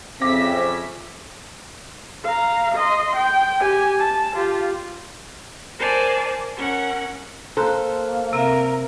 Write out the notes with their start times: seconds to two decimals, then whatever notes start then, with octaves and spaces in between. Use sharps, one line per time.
0.21 F2 C#3 C4 E5 D6 A#6 B6
2.24 F5 A#5
2.75 D#5 C6
3.16 G5
3.61 G4 G#5
3.99 A5
4.36 F4 G4
5.79 A#4 C5 D5 G#5 A5
6.57 C#4 A#4 F#5
7.57 A#3 A4 C5 A#5 F#6
8.33 C3 C4 A#4 E5